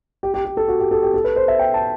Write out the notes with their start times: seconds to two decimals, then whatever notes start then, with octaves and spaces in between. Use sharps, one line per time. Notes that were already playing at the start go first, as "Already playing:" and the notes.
0.23 G4
0.34 G4
0.45 G4
0.57 A4
0.68 F#4
0.80 G4
0.91 A4
1.03 G4
1.14 A4
1.24 B4
1.36 C5
1.48 E5
1.59 G5
1.74 A5